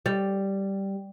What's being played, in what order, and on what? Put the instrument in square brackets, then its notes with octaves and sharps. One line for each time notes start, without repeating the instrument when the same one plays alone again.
[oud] G3